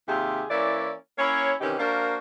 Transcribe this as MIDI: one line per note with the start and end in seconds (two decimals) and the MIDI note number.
0.08 0.44 39
0.08 0.44 48
0.08 0.44 65
0.08 0.44 67
0.08 0.44 68
0.08 0.44 76
0.50 0.92 52
0.50 0.92 58
0.50 0.92 61
0.50 0.92 64
0.50 0.92 74
1.18 1.54 58
1.18 1.54 61
1.18 1.54 64
1.18 1.54 73
1.61 1.77 48
1.61 1.77 51
1.61 1.77 52
1.61 1.77 61
1.61 1.77 63
1.61 1.77 67
1.79 2.17 58
1.79 2.17 62
1.79 2.17 66
1.79 2.17 70
1.79 2.17 72
1.79 2.17 77